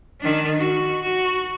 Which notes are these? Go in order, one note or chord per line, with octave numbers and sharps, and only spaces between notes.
D#3 D4
F#4
F#4